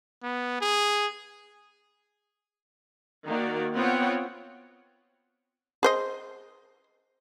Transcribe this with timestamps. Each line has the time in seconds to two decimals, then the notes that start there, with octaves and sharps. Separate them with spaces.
0.23 B3
0.61 G#4
3.27 D#3 A#3 F#4 D5
3.74 B3 C4 F4 C#5 F#5 G5
5.83 G#4 C5 D#5